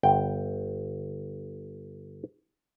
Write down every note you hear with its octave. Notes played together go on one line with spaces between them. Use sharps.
G1 G5